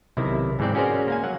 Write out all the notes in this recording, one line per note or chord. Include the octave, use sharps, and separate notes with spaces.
B1 C3 D#3 E4
G#2 E3 C4 D5
C#4 F#4 G#4 A#4 C5 D5
A#3 F5 G#5
F#3 F#5